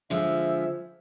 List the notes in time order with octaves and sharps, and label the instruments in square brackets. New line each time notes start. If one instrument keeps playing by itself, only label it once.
[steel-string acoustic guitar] D3 F3 G#3 [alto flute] E5